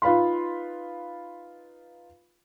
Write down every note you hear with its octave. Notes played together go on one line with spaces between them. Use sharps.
D#4 F4 B4 F5 B5 C6